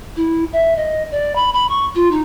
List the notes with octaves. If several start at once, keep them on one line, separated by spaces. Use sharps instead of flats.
E4
E5
D#5
D5
B5
B5
C#6
F4
D#4